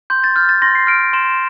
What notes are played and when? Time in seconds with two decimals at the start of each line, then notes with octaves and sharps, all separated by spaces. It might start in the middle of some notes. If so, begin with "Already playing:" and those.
0.10 C6 G6
0.24 A6
0.36 F6 G6
0.49 A6
0.62 C6 A#6
0.75 C7
0.87 F6 D7
1.13 C6 E7